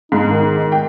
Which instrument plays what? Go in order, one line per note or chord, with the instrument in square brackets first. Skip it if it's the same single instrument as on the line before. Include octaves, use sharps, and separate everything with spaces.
[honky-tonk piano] G#2 [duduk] D#4
[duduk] D#3
[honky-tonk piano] G5